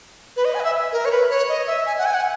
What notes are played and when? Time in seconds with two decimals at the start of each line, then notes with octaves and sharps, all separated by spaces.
0.37 B4
0.45 D#5
0.55 G#5
0.60 D#5
0.64 E5
0.92 A#4
1.05 C#5
1.11 B4
1.30 C#5
1.49 D#5
1.67 E5
1.86 G#5
1.98 F#5
2.05 G#5
2.14 F#5